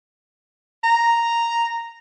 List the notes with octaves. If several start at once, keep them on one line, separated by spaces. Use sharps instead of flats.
A#5